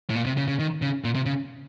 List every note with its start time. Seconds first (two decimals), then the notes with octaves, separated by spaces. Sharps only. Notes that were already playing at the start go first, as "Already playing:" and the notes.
0.10 A2
0.15 A#2
0.26 C3
0.37 C#3
0.48 C#3
0.59 D#3
0.82 C#3
1.04 A#2
1.15 C3
1.26 C#3